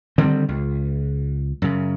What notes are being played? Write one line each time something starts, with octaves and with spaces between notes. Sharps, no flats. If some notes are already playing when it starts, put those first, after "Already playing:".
D3 D#3 G3 C4
C#2
F#2 C#3